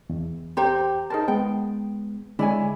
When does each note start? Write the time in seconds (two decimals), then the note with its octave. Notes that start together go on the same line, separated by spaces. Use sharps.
0.10 E2
0.57 G4 C5 A#5
1.10 D#4 G#4 A#4 C5 A5
1.28 G#3 B3 G5
2.39 D3 G#3 E4 C#5 D5 G#5